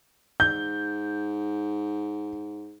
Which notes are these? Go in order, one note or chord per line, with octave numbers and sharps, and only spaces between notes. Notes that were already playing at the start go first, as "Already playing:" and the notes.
G#2 G6